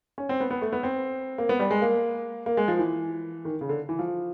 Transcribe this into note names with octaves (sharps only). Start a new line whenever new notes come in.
C#4
C4
B3
B3
A3
B3
C4
A#3
B3
G3
G#3
A#3
A#3
G#3
F3
E3
D#3
C#3
D3
E3
F3